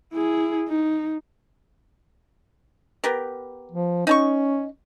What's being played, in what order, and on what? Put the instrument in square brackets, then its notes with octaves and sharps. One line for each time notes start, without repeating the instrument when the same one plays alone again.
[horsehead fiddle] E4 G#4
D#4
[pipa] B3 G4 A#4
[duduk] F3
[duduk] C#4 [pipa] D#4 A5 C#6